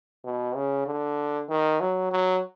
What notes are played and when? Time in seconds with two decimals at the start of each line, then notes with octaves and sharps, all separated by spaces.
0.25 B2
0.56 C#3
0.86 D3
1.49 D#3
1.80 F#3
2.11 F#3